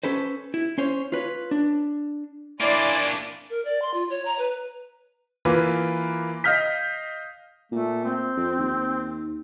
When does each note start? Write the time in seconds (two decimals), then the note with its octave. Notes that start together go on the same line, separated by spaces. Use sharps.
0.04 C#4 A4 B4 C5
0.54 E4
0.78 C#4 C5 C#5
1.12 F4 B4 C#5
1.51 D4
2.61 A#3 D4 E4 D5 G#5 C6
3.50 A#4
3.65 D5
3.82 C6
3.94 F4
4.10 C#5
4.25 A#5
4.38 B4
5.45 E3 A#3 F4 B4
6.44 D#5 F5 F6 G6 B6
7.72 A#2 A3
8.04 C4
8.37 F2
8.59 D#2